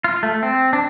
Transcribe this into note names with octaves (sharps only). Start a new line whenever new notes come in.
F4
A3
C4
D4